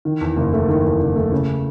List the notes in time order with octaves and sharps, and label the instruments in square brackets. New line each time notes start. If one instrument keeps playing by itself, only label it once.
[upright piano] D#3
E2
F#1
A3
D#3
E2
F#1
A3
C#3